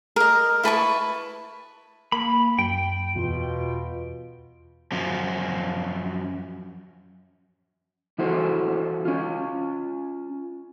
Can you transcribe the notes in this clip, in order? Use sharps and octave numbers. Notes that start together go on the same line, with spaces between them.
A#4 D#5
E4 B4 A5 C#6
A#3 B5
F#2 G5
E2 B2 F4
F#2 F3
E3 E4 F#4 A4 C5
C#4 F4